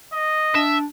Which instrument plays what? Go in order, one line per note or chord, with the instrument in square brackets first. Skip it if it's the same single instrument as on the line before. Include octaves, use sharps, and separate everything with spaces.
[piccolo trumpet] D#5
[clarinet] D4 [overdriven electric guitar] E5